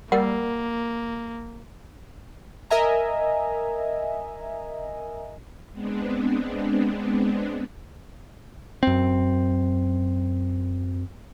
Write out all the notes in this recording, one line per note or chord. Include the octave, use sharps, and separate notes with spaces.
G3 A#3 A#4 F#5
A#4 D#5 E5 G#5 A#5
G#3 B3 C4 D4
F#2 C4